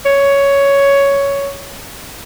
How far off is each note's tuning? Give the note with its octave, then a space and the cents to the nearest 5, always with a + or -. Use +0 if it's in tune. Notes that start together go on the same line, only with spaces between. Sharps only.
C#5 +10